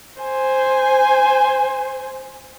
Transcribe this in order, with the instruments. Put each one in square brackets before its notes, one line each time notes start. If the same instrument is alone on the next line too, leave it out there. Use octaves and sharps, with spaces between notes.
[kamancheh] C5 G#5